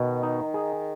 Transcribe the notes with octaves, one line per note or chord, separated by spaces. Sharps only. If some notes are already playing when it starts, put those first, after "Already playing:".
Already playing: B2 D#3
D#4
G#4